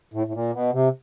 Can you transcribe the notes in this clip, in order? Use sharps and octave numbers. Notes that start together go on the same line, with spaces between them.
A2
A2
A#2
B2
C3